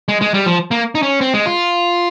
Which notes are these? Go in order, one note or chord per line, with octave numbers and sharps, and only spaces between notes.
G#3
G#3
G3
F3
A#3
D#4
C#4
C4
G#3
F4